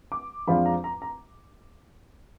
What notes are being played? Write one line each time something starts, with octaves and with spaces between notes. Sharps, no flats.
D6
F2 F3 G#3 D4 F4 B5
A#5
A#5
A#5